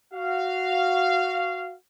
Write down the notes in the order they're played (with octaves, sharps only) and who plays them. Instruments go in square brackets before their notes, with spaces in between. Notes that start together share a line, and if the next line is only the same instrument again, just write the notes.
[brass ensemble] F#4 F5